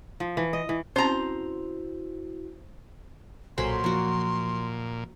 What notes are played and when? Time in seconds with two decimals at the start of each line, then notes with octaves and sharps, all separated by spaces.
0.20 F3
0.37 E3
0.53 D#5
0.69 E3
0.96 C4 C#4 E4 F#4 C5 A#5
3.58 B1 A#2 F#3 A4 C5 G#5 B5 C6
3.84 F3 A#3 F#4